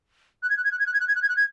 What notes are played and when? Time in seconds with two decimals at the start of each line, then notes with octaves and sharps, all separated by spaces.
0.43 F#6
0.50 G#6
0.57 F#6
0.64 G#6
0.71 F#6
0.79 G#6
0.86 F#6
0.94 G#6
1.00 F#6
1.08 G#6
1.15 F#6
1.22 G#6
1.29 F#6
1.36 G#6